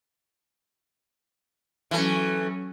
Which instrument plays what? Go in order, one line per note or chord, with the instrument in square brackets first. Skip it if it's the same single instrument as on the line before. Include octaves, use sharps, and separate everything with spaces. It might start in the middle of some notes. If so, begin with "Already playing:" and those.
[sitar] E3 A3 [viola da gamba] F#3 C#4